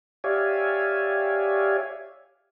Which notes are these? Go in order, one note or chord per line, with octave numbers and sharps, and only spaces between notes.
G4 C#5 D5 E5 F5 G#5